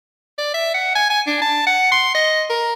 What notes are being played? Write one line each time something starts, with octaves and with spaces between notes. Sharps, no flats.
D5
E5
F#5
G#5
G#5
D4
A5
F#5
C6
D#5
A#4